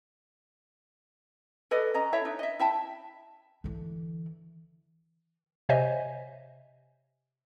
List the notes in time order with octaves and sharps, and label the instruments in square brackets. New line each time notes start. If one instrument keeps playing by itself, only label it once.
[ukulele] A4 B4 D5 D#5
C#4 D#5 A#5
E4 A4 C#5 E5
D4 D#4
D#5 E5
E4 E5 G5 A5
[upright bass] D3 E3
[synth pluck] C3 C5 C#5 D#5 E5 G#5